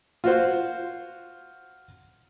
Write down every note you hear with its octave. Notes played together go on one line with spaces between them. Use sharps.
F4 F#4 C5